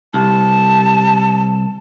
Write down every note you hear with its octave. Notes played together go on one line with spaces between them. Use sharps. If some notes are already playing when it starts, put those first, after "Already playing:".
C2 A5